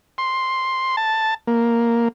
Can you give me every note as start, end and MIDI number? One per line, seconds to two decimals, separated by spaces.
0.18 0.96 84
0.97 1.34 81
1.47 2.08 58